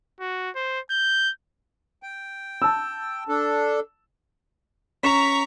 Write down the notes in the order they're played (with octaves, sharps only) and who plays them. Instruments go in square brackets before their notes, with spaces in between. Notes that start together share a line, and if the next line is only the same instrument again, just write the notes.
[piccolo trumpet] F#4
C5
G6
[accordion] G5
[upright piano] A5 E6
[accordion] D4 A4
[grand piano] C#4 E7 [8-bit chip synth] A#5 B6 [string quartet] C#6